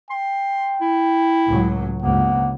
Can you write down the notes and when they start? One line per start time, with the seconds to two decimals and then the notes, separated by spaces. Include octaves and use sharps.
0.10 G5 C6
0.81 E4
1.48 C#2 A2 F#3
2.02 G1 C#2 C3 A#3 F#5